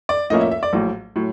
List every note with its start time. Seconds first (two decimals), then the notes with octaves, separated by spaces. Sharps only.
0.09 D5
0.30 A2 F3 A#3 C#4 E4 D#5
0.41 E5
0.52 E5
0.63 D5
0.73 A#1 A2 F#3
1.16 A2 F#3